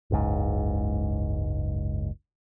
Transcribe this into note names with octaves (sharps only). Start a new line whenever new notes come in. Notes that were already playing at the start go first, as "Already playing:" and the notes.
F#1 C#2 G#2